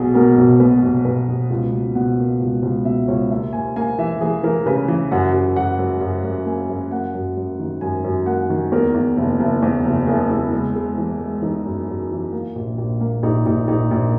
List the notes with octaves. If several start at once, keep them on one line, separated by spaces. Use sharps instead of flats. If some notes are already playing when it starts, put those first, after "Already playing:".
Already playing: B1 B2 G#4
B2 A#4
B1
B2 B4
B1
B1 B4
B1
C#2
B2
B2 F#5
A#3
C#2
C#2
B2 E5
C#2 C#5
D#2 E5
D#2 G#5
A#3 G#5
E3 E5
E3 G#4
E3 A#4
C#3 B4
E3
F#2 F#5
F#2
F#2 F#5
F#2
F#2
F#2
A#3 G#5
F#2 E5
A#3 F#5
F#2
F#2
D#3
F#2 G#5
F#2
A#3 F#5
D#3
E2 A#4
E2
F#1
F#1
E2
F#1
F#1 G#4
E2 E4
G#3
G#3
E3
G#3
E3 D#4
F#2
F#2
E3
A#3
A#1
A#1
A#3
A#1 D#4
A#1 D#4
A#1 D#4
A#1